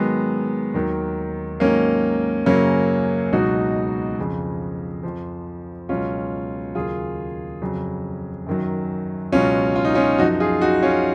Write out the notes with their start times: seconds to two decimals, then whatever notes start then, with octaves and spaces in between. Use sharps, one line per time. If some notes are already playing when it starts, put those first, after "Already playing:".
Already playing: G#2 D#3 F#3 G#3 B3
0.74 D#2 D#3 F#3
1.60 G#2 D#3 F#3 A#3 C#4
2.46 F#2 C#3 F#3 A#3 C#4
3.32 C#2 B2 F#3 D#4 F#4
4.19 F2 C#3 F3
5.03 F2 F3
5.89 C#2 B2 F#3 C#4 F4
6.75 D#2 C#3 F#3 F4 G#4
7.62 F2 C#3 F#3
8.47 F#2 D#3 F#3
9.32 C#2 B2 F#3 C#4 F4
9.75 F4
9.85 D#4
9.94 C#4 F4
10.18 F#2 F3 D#4 F#4
10.40 F4 G#4
10.61 D#4 F#4
10.83 C#4 F4